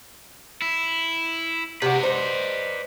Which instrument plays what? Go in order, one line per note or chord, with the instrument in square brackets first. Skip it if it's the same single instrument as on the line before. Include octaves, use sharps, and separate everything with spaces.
[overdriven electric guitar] E4
[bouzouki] C3 F#4 [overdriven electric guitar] B4 D5
[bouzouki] D#4 C5